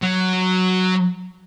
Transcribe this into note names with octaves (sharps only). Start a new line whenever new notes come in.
F#3